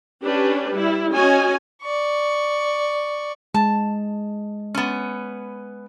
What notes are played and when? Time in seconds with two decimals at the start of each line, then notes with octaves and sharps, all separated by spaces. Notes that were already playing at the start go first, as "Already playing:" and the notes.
0.23 C#4 D4 G4 B4
0.71 G3 E4
1.13 C#4 F#4 C#5 D#5 G#5
1.83 D5 C#6
3.54 G#3 A5
4.74 B3 C#4